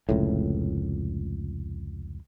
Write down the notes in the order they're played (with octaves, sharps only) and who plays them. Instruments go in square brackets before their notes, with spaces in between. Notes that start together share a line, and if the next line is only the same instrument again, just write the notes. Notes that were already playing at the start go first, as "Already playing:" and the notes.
[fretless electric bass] F1 C#2 A2